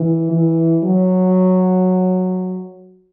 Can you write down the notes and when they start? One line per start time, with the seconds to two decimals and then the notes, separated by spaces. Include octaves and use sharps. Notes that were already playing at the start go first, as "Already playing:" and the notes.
Already playing: E3
0.31 E3
0.84 F#3